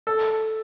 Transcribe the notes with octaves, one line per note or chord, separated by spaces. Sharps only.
A4